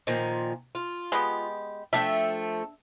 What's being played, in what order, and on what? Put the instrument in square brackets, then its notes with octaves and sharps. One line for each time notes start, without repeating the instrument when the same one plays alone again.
[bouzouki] A#2 D#3 F3
F4
[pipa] G#3 B3 G4
[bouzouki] F3 A3 G5 [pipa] D4 E5